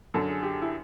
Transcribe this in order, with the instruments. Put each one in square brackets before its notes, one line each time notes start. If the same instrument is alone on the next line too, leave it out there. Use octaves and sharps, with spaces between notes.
[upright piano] F#2 D3 F#3 A4
G#4
G4
E4